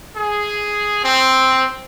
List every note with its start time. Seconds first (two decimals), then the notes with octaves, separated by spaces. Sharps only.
0.17 G#4
1.03 C4